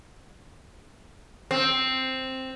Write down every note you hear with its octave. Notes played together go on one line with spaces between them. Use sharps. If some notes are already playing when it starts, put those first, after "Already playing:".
C4